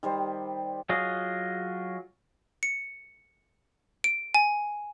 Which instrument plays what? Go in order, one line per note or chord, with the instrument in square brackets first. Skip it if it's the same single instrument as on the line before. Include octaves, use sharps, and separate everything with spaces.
[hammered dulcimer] D#3 G3 C5
[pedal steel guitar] F#3 F4 G#4 D#5
[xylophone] C#7
D7
G#5